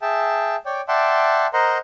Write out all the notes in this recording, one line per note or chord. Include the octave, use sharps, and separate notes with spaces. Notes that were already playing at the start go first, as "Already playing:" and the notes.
G#4 E5 G5 A5
C#5 D5 G5
D5 E5 F#5 G5 A5 C6
A#4 C5 D#5 F#5 A#5 C6